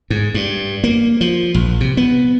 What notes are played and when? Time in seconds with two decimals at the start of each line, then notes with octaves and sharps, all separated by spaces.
0.10 G#2
0.34 G2
0.84 A#3
1.21 F3
1.54 A#1
1.80 C3
1.97 B3